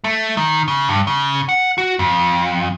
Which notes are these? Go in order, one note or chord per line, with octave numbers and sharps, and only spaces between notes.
A3
D#3
C#3
G2
C#3
F#5
F#4
F2